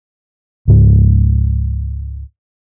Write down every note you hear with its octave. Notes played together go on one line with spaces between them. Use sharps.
C#2 G#2 F3